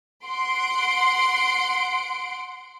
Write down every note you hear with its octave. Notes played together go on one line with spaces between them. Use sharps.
F#5 C6 D7